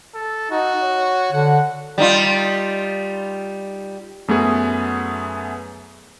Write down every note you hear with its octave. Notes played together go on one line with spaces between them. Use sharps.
A4
D#4 F#4
C#5
D3 F#5
G3 D#4 F4
F#2 A3 B3 G#4